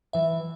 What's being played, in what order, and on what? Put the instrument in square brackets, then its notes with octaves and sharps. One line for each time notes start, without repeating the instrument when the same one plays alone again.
[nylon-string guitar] E3 [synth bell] E5